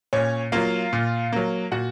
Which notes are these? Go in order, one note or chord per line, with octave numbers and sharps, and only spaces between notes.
A#2 C#4 C#5
F#3 A#3 F4 F5
A#2
F#3 A#3
A#2 F#4 F#5